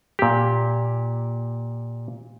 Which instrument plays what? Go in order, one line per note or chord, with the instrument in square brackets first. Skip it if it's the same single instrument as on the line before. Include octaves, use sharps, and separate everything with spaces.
[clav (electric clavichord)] A#2 G4